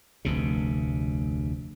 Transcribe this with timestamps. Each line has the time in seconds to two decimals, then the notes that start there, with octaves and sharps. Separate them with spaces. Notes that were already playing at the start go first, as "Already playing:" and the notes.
0.25 F1 D2 C3